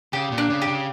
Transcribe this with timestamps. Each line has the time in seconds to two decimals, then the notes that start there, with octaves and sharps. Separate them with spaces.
0.13 C#3 G4
0.32 A#2
0.38 D4
0.50 C#3
0.62 G4
0.67 C#3